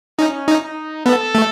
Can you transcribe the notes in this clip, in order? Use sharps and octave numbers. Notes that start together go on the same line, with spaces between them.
C#4 D#4
D#4
D#4
B3 A4
A3